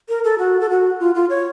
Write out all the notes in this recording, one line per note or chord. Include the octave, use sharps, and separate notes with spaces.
A#4
A4
F#4
A4
F#4
F4
F4
C#5